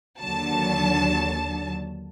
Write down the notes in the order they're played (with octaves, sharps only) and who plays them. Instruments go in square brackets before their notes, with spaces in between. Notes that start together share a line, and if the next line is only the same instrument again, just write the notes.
[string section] D#2 D3 F#3 A5